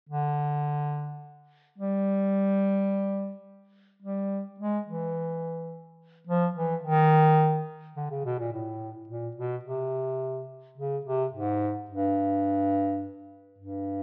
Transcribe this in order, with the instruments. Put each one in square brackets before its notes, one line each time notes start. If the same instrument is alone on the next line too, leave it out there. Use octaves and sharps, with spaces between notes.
[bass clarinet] D3
G3
G3
G#3
E3
F3
E3
D#3
D3
C#3
B2
A#2
A2
A#2
B2
C3
C#3
C3
G#2
G2
G2